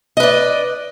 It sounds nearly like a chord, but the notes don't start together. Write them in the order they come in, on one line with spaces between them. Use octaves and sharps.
D#5 B4 D5